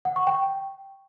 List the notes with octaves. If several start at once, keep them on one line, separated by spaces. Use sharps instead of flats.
F#5
C#6
G5